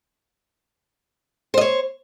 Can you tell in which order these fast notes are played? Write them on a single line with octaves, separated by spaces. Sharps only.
C5 D#5 C#5